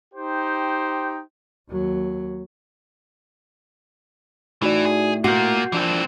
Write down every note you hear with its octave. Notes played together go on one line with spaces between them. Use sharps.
D#4 G4 C5 G5
D#2 F#3
A2 E3 D#4 F#4 D5
G#4
A#2 A#3 F#4 G6 C7
E3 F3 C4 D4